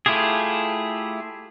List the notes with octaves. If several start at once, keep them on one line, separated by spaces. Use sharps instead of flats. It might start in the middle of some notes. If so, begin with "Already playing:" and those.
A3 E4 F4 G4 G#4